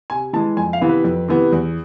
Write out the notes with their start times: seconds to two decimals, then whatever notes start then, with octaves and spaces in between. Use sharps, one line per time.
0.10 C3 G#5
0.33 E3 G#3 A5
0.57 F2 G#5
0.73 F5
0.81 C3 E3 B3
0.89 B4
1.04 F2
1.28 C3 E3 B3
1.52 E2